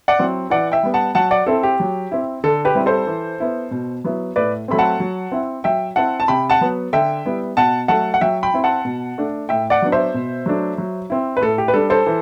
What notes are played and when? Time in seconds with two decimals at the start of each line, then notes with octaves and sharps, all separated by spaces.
0.08 D5 F#5
0.19 F#3 C4 E4
0.50 E3 D5 F#5
0.72 E5 G5
0.83 G3 B3
0.94 F#5 A5
1.15 F#3 F#5 A5
1.31 D5 F#5
1.47 C4 E4 A4
1.63 G4
1.80 F#3
2.11 C4 E4
2.44 D3 A4
2.65 G4 B4
2.75 G3 C4 E4
2.86 A4 C5
3.07 E3
3.40 B3 E4
3.71 B2
4.04 F#3 B3 E4
4.36 A2 B4 D5
4.68 F#3 A3 C4 B5
4.79 F#5 A5
5.00 F#3
5.32 C4 E4
5.64 F#3 E5 G5
5.96 C4 E4 F#5 A5
6.20 A5
6.28 C3 G5 B5
6.50 F#5 A5
6.61 F#3 B3
6.93 D3 E5 G5
7.25 G3 B3 E4
7.57 B2 F#5 A5
7.88 F#3 A3 F#5 A5
8.14 F#5
8.21 F#3 E5 G5
8.43 G5 B5
8.54 C4 E4
8.64 F#5 A5
8.85 B2
9.18 A3 D4
9.49 A2 E5 G5
9.70 D5 F#5
9.82 F#3 B3 D4
9.92 C5 E5
10.14 B2
10.46 F#3 A3 D4
10.78 F#3
11.10 C4 E4
11.37 B4
11.41 A2 A4
11.58 G4
11.68 B4
11.74 G3 D4 A4
11.90 A4 C5
12.07 E3